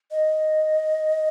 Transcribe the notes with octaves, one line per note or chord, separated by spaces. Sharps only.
D#5